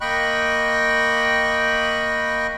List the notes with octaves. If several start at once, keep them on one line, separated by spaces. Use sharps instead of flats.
A#3 D#5 G5 B5 C#6 F#6